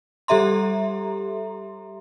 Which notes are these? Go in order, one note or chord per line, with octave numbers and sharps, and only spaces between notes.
G3 G4 A4 E5 A#5 C6